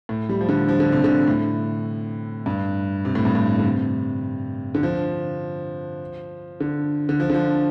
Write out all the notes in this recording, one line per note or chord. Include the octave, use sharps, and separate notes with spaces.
A2
G3
F3
D3
F3
D3
C3
D3
A2
G2
C3
A2
G2
A2
D3
C3
D3
F3
D3
D3
F3
D3
F3